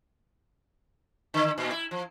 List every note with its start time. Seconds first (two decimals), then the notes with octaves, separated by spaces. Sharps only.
1.34 D3
1.58 A#2
1.72 E4
1.91 F3